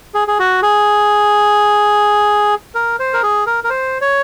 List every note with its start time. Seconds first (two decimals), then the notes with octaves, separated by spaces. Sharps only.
0.14 G#4
0.28 G#4
0.39 F#4
0.63 G#4
2.75 A#4
2.99 C5
3.13 A#4
3.23 G#4
3.47 A#4
3.64 A#4
3.70 C5
4.01 C#5